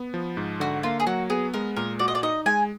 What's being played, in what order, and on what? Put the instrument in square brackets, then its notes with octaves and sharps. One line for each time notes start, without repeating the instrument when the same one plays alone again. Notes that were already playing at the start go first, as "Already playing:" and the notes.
Already playing: [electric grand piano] B3
F3
G#2
[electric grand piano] D3 [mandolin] F#4
[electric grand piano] A#3 [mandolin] F4
[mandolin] G#4
[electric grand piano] F#3 [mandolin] F#4
[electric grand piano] B3 [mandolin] G#4
[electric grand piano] G#3 [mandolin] A#4
[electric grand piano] A#2 [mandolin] A#4
[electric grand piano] F#4 [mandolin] D5
[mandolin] D#5
D5
[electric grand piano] D#4 [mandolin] D#5
[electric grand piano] G#3 [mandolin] G#5